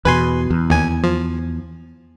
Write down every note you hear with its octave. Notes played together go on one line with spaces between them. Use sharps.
E2 B2 B4 G#5 C6
E2
D#2 G#5
F3